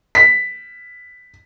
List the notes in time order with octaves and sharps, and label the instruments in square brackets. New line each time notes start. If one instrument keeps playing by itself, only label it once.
[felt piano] B6